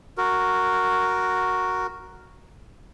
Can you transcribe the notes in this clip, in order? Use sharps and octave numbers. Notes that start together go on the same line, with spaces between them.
F#4 A#4